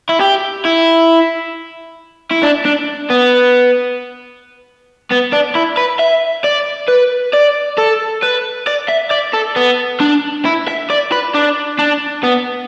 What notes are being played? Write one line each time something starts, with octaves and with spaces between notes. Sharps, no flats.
E4
G4
E4
E4
D4
D4
B3
B3
D4
E4
B4
E5
D5
B4
D5
A4
B4
D5
E5
D5
A4
B3
D4
E4
E5
D5
B4
D4
D4
B3